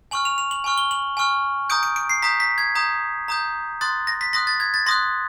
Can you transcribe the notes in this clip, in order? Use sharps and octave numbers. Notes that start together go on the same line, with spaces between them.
G#5 C#6 F6 F#7
F7
F7
F#7
G#5 C#6 F6
G7
F#7
G#5 C#6 F6
A#5 D#6 G6 D7
D7
D7
C7
A#5 D#6 G6 B6
B6
G#6
A#5 D#6 G6
A#5 D#6 G6
C6 D#6 F#6 A6
A#6
B6
C6 D#6 F#6 A#6
A6
G#6
A6
C6 D#6 F#6 A#6